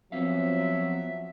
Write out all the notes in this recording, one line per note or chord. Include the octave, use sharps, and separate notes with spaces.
F3 F#3 B3 C4 E5 F5